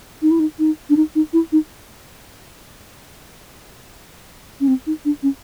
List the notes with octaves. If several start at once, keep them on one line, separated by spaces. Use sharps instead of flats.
D#4
E4
D#4
D#4
D4
D#4
D#4
E4
D#4
C#4
C4
D#4
D4
C#4